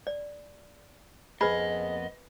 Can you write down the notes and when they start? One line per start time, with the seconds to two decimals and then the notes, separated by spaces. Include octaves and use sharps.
0.07 D5
1.41 F2 A#3 B3 G#4 B4 D#5 B5